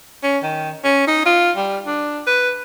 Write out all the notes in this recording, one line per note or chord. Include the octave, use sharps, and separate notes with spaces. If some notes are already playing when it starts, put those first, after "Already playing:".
C#4
D#3
C#4
D#4
F4
G3
D4
B4